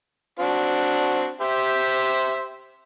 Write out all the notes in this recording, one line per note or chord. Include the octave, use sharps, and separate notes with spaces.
C4 D4 F#4
G4 C5 E5